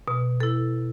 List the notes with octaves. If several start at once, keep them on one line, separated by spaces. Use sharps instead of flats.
B2
E4 A4